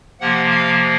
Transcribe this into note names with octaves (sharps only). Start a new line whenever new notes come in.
C3 F3 A#3 F#5
F5